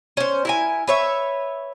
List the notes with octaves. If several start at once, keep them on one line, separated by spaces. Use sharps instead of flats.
C#4 C5
E4 A#4 G#5
B4 C#5 E5